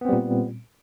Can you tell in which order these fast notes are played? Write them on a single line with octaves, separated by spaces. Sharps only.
B3 C4 G3 A#2